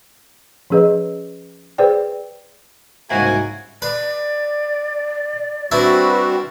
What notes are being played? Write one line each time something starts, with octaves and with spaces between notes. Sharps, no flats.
F3 C#4 G#4 B4 D#5
G#4 B4 C5 D5 G5
C2 G#2 A#3 C#4 E4 F#4 G#5
B4 D5
G3 C4 D4 E4 F#4 B4 E5